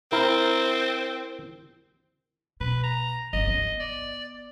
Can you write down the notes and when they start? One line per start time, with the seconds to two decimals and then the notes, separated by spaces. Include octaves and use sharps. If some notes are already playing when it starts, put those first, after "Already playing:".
0.12 C4 E4 A#4
2.60 B2 B4
2.84 A#5
3.33 G1 C#2 D#5
3.47 B3
3.80 D5